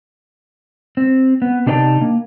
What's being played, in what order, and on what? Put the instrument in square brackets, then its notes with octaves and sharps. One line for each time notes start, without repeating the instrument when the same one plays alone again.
[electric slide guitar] C4
B3
C3 D4 D#4 B4 G5 A5
A#3